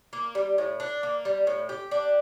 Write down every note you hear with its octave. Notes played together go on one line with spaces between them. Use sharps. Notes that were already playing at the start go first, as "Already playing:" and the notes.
A#3
G3
A2
D4
A#3
G3
A2
G4
D4